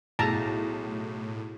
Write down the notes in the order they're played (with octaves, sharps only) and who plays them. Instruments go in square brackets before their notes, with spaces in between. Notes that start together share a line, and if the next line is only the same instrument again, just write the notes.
[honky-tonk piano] B1 [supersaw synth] A2 [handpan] E4 F#4 G#4 [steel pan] A5 A#5